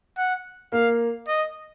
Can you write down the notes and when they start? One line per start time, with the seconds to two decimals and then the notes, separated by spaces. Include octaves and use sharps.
0.18 F#5
0.72 A#3 F5
1.28 D#5